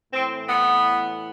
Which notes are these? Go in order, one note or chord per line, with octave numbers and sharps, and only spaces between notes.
A2 E3 C4
B3